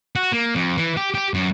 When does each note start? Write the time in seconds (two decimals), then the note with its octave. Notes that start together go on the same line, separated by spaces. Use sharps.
0.16 F#4
0.32 A#3
0.55 F2
0.77 E3
0.97 G4
1.15 G4
1.34 F#2